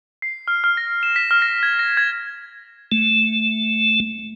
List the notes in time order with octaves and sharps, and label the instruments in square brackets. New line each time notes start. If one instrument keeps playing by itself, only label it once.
[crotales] C7
F6
F6
A#6
E7
B6
F6
A#6
G#6
A#6
G#6
[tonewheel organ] A3